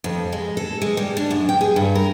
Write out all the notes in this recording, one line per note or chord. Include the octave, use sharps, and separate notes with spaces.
F2
G#3
A4
G#3
G3
D4
F#2
G5
G#4
G2
A#4